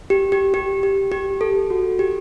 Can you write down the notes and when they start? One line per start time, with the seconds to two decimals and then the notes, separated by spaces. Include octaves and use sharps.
0.10 G4
0.32 G4
0.54 G4
0.83 G4
1.12 G4
1.41 A4
1.70 F#4
1.99 G4